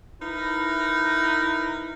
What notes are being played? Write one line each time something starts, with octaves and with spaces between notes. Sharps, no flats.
D#4 E4 A#4 B4